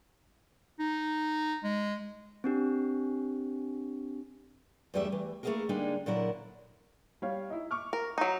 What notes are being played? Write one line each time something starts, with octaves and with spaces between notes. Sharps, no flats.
D#4
G#3
C4 D4 G4
E2 G2 G3 A3 G4 E5
E3
A3 A#3 D#4 E4 G#4 A#4
D3 G3 G#3 A#3 D4 D#4
A#2 D3 F#3 E4 A#4
G3 C#5 F5
D#4 E4
C#6 D6 F6
A#4
F#3 D#4